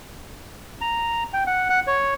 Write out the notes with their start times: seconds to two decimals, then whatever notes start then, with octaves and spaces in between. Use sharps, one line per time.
0.81 A#5
1.33 G5
1.47 F#5
1.70 F#5
1.87 C#5